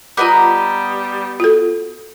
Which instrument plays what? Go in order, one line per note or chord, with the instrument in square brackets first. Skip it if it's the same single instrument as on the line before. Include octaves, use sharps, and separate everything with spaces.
[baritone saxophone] G3 [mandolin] B3 D#5 A#5 [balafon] F4 D6
[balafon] F4 F#4 A4